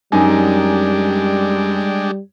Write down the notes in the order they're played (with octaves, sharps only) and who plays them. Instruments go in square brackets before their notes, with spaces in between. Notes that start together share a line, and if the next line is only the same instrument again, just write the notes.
[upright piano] F#2 D#4 G#5 [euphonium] G3 [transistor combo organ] G#3 D4 G4